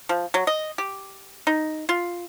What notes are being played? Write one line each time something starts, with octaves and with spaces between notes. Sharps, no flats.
F3
F#3
D#5
G4
D#4
F4